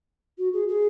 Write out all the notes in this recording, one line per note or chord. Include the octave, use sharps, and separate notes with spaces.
F#4
G#4
G#4